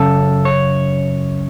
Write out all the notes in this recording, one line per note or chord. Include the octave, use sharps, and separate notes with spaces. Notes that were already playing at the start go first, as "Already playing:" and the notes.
Already playing: F#2 C#3 A4
C#5